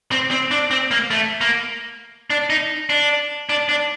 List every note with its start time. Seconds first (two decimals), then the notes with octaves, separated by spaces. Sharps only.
0.11 C4
0.31 C4
0.51 D4
0.71 C4
0.91 A#3
1.11 A3
1.41 A#3
2.30 D4
2.50 D#4
2.90 D4
3.49 D4
3.69 D4